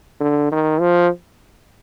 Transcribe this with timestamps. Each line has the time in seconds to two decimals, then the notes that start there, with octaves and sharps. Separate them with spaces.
0.20 D3
0.51 D#3
0.80 F3